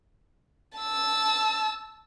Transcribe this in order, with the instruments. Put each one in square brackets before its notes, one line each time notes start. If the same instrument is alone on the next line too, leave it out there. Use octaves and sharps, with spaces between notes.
[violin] A5 E6